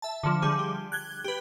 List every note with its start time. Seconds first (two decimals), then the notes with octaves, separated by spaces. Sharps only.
0.02 E5 A5
0.23 D3 F3
0.42 D3 G3 G#4
0.59 G4
0.92 F#6 G#6 G7
1.24 G4 B4